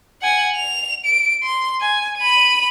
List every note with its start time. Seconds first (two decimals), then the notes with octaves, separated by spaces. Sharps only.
0.22 F#5 G#5
0.56 F7
1.05 D7
1.43 C6
1.81 G#5
2.18 B5 D#7